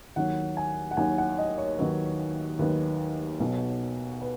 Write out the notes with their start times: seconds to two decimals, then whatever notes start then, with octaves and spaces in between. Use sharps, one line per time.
0.16 D#2 D#3 F#3 F#5
0.57 G#5
0.91 F#5
0.97 D#2 D#3 F#3 G#5
1.18 F#5
1.38 D#5
1.58 C#5
1.78 D#2 D#3 F#3 B4
2.59 D#2 D#3 F#3 B4
3.40 B1 B2 F#3
4.21 B4